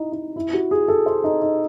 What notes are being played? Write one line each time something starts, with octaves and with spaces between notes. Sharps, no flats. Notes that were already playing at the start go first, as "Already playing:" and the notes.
Already playing: D#4 E4
D#4
E4
F#4
G#4
A4
C5
D#4
D#4